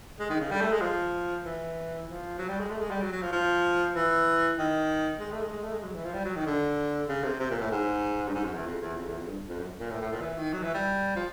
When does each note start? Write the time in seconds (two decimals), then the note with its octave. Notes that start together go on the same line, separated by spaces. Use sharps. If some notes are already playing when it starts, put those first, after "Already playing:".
0.19 G#3
0.30 D#3
0.40 C#3
0.51 G3
0.61 A3
0.72 G#3
0.82 F3
1.44 E3
2.07 F3
2.39 F#3
2.48 G3
2.60 G#3
2.70 A3
2.80 G#3
2.90 G3
3.01 F#3
3.12 F#3
3.22 F3
3.32 F3
3.95 E3
4.58 D#3
5.20 G#3
5.31 A3
5.41 G#3
5.51 G#3
5.63 A3
5.73 G#3
5.83 F#3
5.94 E3
6.04 F3
6.14 G3
6.25 F#3
6.36 D#3
6.46 D3
7.08 C#3
7.24 C3
7.40 C3
7.50 A#2
7.61 A2
7.71 G#2
8.28 G2
8.34 G#2
8.45 F#2
8.54 E2
8.65 F2
8.81 E2
8.96 F2
9.07 E2
9.18 F2
9.27 G2
9.48 F2
9.59 F#2
9.80 A#2
9.91 A2
10.01 A2
10.12 A#2
10.21 E3
10.37 D#3
10.53 F#3
10.63 E3
10.74 G3
11.16 F3